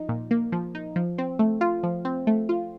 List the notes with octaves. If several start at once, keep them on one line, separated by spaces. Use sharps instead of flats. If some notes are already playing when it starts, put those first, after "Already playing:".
Already playing: F3 D#4
A#2
A#3
F3
D#4
F3
C4
A3
F4
F3
C4
A3
F4